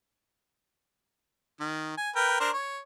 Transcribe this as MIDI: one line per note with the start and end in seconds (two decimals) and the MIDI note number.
1.60 1.96 51
1.97 2.11 80
2.16 2.40 70
2.16 2.40 71
2.16 2.40 79
2.40 2.50 62
2.40 2.50 70
2.40 2.50 72
2.53 2.80 73